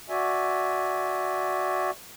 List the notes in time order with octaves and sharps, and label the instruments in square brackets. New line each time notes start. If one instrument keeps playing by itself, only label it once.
[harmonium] F#4 D5 E5 G#5